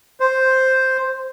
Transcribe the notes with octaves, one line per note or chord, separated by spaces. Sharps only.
C5